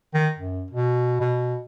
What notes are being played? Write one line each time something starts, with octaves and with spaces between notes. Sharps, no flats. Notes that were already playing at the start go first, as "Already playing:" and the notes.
D#3
F#2
B2
B2